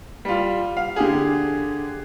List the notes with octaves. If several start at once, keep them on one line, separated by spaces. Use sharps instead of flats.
G3 F4
F5
D3 G4 G#4